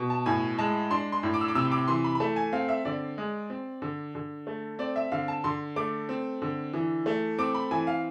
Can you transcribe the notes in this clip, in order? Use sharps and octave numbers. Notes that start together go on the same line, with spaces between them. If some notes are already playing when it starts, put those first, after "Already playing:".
Already playing: B2
A5
A2 G#5
G#3 A5
D4 C6
C6
A2
D6
E6
D6
C3 E6
D6
E3 C6
B5
B5
A3 A5
G#5
C4 F5
E5
D3 D5
G#3
C4
D3
D3
A3
C4 D5
E5
D3 F5
A5
D3 C6
A3 D6
C4
D3
E3
A3
C4 D6
B5
E3 G#5
F5